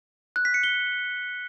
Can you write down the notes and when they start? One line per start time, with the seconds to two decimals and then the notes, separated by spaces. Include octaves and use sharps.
0.36 F#6
0.45 B6
0.54 C#7
0.64 G7